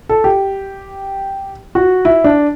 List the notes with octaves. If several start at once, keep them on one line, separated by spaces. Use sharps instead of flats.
A4
G4
F#4
E4
D4